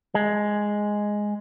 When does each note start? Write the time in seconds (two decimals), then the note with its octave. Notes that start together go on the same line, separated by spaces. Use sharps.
0.15 G#3